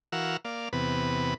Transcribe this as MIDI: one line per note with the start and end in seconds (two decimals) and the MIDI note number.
0.12 0.37 52
0.12 0.37 66
0.12 0.37 70
0.12 0.37 77
0.12 0.37 78
0.12 0.37 88
0.45 0.69 58
0.45 0.69 74
0.45 0.69 77
0.73 1.34 40
0.73 1.34 48
0.73 1.34 59
0.73 1.34 71